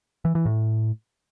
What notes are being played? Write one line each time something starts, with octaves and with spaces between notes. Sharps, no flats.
E3
E3
A2